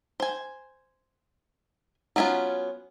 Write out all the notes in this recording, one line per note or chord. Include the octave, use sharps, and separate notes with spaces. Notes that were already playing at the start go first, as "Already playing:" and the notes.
C5 G#5
F#3 B3 C#4 E4 F4